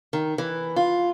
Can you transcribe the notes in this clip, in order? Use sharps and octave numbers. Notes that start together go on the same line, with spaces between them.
D#3
E3
F4